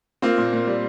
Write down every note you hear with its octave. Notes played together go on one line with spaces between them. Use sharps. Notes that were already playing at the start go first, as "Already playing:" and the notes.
A#3 C4 F4
A#2
A#2
G3